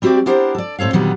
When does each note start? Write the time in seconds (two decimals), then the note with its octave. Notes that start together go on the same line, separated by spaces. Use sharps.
0.02 G3 C4 F#4 G4 D5 E5
0.26 B3 D4 E4 G4 A#4 C5
0.55 A4 D5
0.79 A2 C4 A4 C#5 F5
0.93 A#2 D3 D#3 F#3 G3 B3